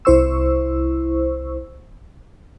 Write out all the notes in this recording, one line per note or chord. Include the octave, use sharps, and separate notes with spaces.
C2 E4 C5 C#6 E6